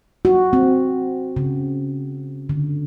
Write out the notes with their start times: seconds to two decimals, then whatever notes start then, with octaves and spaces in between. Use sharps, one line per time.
0.25 F#4
0.53 C4
1.37 C#3
2.49 D3